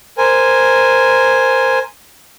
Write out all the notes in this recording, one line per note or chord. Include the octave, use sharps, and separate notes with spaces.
A#4 C5 G#5